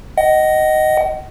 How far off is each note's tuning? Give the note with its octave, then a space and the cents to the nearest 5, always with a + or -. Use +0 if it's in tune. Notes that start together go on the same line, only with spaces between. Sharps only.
D#5 +0 F#5 +35